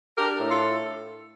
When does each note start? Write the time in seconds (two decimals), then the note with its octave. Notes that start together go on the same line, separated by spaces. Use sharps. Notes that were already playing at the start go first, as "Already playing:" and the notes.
0.16 D4 G4 A#4
0.40 A2
0.50 F4 A4